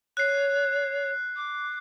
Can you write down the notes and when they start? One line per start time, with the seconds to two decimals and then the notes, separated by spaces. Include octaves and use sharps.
0.17 C#5 F#6 C7
1.36 D6